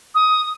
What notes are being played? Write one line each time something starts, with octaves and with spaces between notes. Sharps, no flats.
D#6